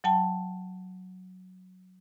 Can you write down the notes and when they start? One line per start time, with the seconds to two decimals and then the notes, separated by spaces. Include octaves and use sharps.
0.04 F#3 G5 A5